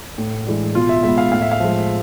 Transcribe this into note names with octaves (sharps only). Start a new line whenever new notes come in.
A2
E3 G#3 D4
B2 F4
E5
G#3 B3 E5
F5
A2 F5
E5
F5
F3 G#3